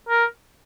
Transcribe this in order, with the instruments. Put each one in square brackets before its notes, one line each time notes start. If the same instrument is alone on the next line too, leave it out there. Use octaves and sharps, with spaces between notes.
[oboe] A#4